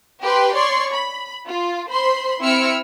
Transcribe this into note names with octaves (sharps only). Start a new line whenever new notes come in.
G4 B4 G5 C6
C#5 D5 C6 C#6
B5
F4
C5 B5 C6
C4 E4 E6 F6 C#7 D7